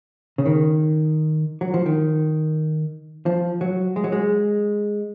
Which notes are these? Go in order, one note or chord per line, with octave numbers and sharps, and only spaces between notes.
C#3
D#3
F#3
F3
D#3
F3
F#3
G#3
F#3
G#3